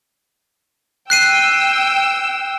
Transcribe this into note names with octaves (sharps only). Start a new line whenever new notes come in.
G5 E6 F#6 C7 D#7